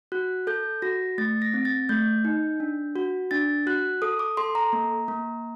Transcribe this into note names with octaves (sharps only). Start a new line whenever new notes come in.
F#4 F#6
A4 G6
F#4 A#6
A3 A6
A#6
C4
A6
A3 G6
D#4
D4
F#4
D4 A6
F#4 F#6
A4 D#6
D6
A4 C6
A#5
A#3
A#3